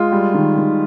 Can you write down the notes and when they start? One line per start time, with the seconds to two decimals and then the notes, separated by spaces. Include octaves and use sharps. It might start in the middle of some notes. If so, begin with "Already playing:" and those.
Already playing: G#3 F4
0.12 G3
0.34 D#3
0.58 D#3